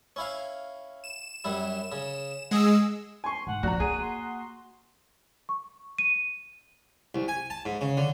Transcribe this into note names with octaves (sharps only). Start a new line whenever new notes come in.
C#4 E4 F5
E7
F#2 G3 E4
C#3
G#3 G#4 F#5 E6
G#5 C6 C#6
G#2 F#5
A#2 F3 F#4 A#5
A#3 G#4 D#7
C6
C#6
D#7
C2
G#5
A5
G#2
C#3
D3